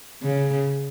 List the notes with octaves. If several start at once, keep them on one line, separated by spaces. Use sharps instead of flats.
C#3